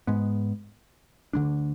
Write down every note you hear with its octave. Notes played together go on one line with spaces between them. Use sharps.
G#2 G#3 B3
D2 D3 G#3 D4